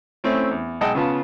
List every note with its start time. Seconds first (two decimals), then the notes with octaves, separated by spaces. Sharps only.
0.24 A3 C4 C#4 E4
0.51 E2
0.81 B1 G#3 D#5 F#5 G5 A5
0.95 C#3 B3 F4 A5